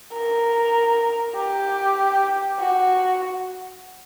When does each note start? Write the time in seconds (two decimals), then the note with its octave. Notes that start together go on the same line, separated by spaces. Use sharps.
0.14 A#4
1.36 G4
2.60 F#4